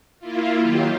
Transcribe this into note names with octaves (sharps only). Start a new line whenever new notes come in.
A#3 E4 F4
D#3 F#3 F4 G4